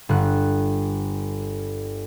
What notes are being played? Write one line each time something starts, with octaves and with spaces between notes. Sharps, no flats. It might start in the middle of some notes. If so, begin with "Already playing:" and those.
G1 F#6